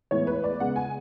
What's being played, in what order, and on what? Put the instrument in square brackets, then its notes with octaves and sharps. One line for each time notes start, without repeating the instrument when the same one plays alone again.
[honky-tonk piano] A2 E3 G#3 B3 C#5
B4
D5
C#3 G#3 B3 F#5
G#5